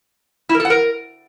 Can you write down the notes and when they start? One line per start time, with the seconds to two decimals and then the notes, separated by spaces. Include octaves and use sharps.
0.49 E4
0.55 A#4
0.60 A4
0.65 F#5
0.70 A#4